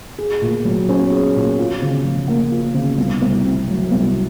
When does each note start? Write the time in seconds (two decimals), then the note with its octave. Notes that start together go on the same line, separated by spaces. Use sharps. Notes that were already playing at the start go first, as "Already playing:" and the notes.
0.18 G#4
0.42 A#2
0.65 F#3
0.89 C#4
1.12 G#4
1.36 A#2
1.59 F4
1.82 C#3
2.05 F3
2.28 A#3
2.51 F4
2.74 C#3
2.98 C2
3.22 C2
3.45 C3
3.68 F#3
3.91 C2